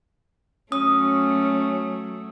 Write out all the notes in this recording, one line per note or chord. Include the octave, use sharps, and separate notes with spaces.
F#3 A3 C#4 F#4 D#6